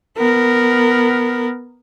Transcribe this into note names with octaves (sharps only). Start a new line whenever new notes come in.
B3 A#4